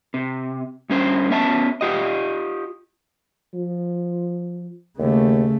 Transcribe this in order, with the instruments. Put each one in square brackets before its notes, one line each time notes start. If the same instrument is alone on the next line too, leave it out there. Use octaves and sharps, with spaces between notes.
[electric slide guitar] C3
G2 C#4 C5
B3 C#4 E5 G#5 A5
F4 G4 D#5
[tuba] F3
[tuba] D#2 [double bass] C#3 A3